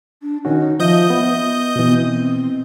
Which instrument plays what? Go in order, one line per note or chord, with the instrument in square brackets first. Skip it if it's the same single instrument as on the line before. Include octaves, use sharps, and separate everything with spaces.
[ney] D4
[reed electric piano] D#3 C#4 F#4 [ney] D#4
[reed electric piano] F3 [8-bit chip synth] D#5 D#6 G6 [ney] E5
[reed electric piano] B3
[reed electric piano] B2 E3 [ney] B3
[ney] C4